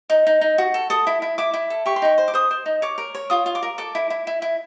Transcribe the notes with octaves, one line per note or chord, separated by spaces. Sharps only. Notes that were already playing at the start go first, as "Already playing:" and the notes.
D#4
D#4
D#4
F#4
A4
A4 D#6
E4
E4
E4 D6
E4
A4
G4 C#6
C6
D#4 C#6
C5
D6
C5 D#6
C5
D#4
C#5 D6
A#4
C#5
F4 D#6
F4
D6
A#4
A4 D6
E4
E4
E4
E4